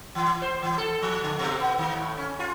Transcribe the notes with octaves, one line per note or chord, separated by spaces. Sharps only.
E3
C5
E3
A4
F3
D3
B2
B3
D#3
A2
C#4
F4